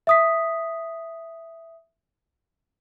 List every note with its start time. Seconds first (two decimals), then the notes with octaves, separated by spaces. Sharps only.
0.07 E5 D#6 B6